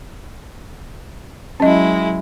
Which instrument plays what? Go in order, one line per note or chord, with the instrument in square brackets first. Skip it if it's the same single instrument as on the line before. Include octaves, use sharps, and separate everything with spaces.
[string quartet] F#3 G#3 E4 [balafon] C#4 D#5